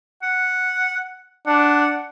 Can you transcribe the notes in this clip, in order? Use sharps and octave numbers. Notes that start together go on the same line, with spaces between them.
F#5
D4 F#5